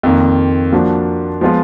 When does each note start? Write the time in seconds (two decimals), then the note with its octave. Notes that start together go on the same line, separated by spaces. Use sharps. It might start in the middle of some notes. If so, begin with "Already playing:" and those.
0.03 F2 D#3 A#3
0.72 F3 A#3 D4 F#4
1.41 F3 G#3 B3 F4